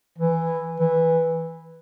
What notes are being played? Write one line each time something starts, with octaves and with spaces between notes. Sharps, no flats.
E3
E3